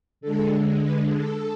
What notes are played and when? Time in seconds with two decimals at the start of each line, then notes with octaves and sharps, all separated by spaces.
0.21 D3 G#3 A4
0.82 B4
1.13 A4